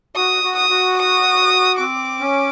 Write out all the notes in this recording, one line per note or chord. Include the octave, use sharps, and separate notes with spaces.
F#4 D#6
F#4
D#6
F#4
D#6
C4 D6
C#4